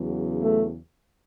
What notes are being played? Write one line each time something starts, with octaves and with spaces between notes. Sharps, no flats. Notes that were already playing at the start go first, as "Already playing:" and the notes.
Already playing: E2 C#3 F#3
A3